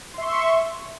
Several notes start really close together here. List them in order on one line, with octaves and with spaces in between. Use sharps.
C6 E5 C#6